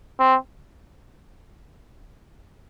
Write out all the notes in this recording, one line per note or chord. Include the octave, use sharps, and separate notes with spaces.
C4